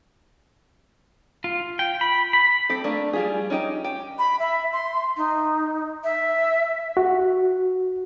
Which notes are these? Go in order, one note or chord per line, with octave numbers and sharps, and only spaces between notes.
F4
G5
B5
B5
C4 G4 A4
A3 A#3 D4
G3 F4 G#4
C#4 D#4 G4 D#5
G4
B5
E5
C6
D#4
E5
F#4